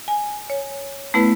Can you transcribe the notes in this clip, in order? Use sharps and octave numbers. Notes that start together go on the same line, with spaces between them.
G#5
C#5
A3 B3 E4 B4